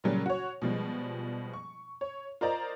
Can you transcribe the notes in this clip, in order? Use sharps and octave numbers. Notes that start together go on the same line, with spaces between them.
A#2 C#3 F#3 G3
F#4 C#5
B2 F3 G3 G#3
C#6
C#5
F4 A#4 C5 D5 D#5 A#5